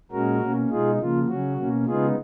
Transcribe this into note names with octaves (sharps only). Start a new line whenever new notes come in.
A#2 G#3 C#4 F#4 A#4
B2 A#3 C#4
B2 G#3 D#4 F4 G#4
C#3 F3 A#3 F4
C#3 F#3 C#4 F#4
B2 A#3 C#4
C#3 G#3 B3 D#4 F4 G#4